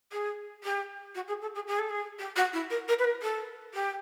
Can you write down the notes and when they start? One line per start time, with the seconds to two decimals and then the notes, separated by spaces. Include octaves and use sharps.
0.12 G#4
0.64 G4
1.15 F#4
1.28 G#4
1.42 A4
1.55 G#4
1.67 G#4
1.79 A4
1.90 G#4
2.19 G4
2.36 F#4
2.53 E4
2.70 A#4
2.88 A#4
2.99 B4
3.04 A#4
3.22 A4
3.74 G4